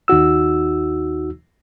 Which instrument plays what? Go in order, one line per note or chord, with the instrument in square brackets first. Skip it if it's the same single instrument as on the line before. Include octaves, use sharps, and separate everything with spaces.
[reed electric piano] D#2 D#4 F#4 E6